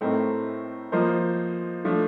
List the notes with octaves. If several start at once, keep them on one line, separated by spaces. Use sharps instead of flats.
A2 A3 C4 D#4 A#4
F3 A#3 F4 C5 D#5
F3 A3 D4